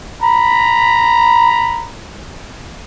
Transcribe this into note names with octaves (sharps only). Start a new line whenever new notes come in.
A#5 B5